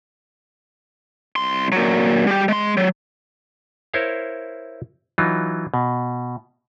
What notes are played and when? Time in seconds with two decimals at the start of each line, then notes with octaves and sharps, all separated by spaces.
1.36 C2 C6
1.72 A#2 F#3
2.27 G3 G4
2.48 G#3 C6
2.77 F#3
3.94 E4 A#4 C5 C#5 E5 F5
5.18 E3 F#3 D#4 F4
5.74 B2